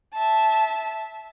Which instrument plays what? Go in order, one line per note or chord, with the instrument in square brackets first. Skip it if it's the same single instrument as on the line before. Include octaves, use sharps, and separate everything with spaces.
[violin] E5 A5